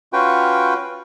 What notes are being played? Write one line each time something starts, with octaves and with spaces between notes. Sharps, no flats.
C#4 F4 F#4 B4 G5